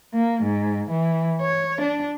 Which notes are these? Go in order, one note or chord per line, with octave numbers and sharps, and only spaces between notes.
A#3
G#2
E3
C#5
D4